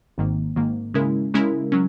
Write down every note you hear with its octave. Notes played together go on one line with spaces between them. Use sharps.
G#1 G#2 D#3 A#3
G#1 G#2 D#3 A#3
C#3 G#3 C#4 E4 A#4
C#3 G#3 C#4 E4 A#4
F#3 C#4